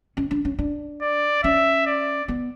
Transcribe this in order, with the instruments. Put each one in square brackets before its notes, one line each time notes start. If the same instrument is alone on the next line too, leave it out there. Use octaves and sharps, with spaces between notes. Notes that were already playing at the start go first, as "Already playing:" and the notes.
[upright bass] C#4
D4
C#4
D4
[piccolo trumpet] D5
[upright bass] C#4 [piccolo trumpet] E5
[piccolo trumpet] D5
[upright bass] B3